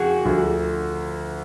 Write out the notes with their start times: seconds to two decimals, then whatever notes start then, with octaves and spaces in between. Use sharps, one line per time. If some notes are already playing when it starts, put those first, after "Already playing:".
Already playing: F2 C#3 F#4 G#4
0.25 D2 D3 F3